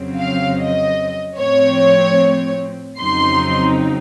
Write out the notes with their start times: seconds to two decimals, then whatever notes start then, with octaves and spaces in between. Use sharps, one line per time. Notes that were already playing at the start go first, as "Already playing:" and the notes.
Already playing: F2 C#3 F#3 C4
0.17 F5
0.58 D#5
1.38 A2 F3 C4 C#5
2.99 F2 C#3 F#3 C4 D#4 C6